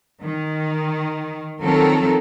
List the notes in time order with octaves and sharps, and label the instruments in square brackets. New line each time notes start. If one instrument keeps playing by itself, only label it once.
[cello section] D#3
D#3 F3 F#3 C4 A4 A#4